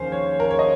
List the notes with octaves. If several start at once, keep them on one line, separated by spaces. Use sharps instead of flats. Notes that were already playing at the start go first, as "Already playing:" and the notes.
Already playing: D#2 C#3 F3 C5 F5 G#5
C#5
A#4
C#5
D#5